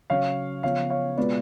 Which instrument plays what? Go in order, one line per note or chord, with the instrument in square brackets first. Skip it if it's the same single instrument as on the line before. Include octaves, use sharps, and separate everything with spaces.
[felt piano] C#3 F#3 C#4 [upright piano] C#5 F5
[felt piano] C#3 F3 B3 [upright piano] C#5 F5
[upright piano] C#5 F5
[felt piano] B2 G#3 B3 F4 [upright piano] B4 D5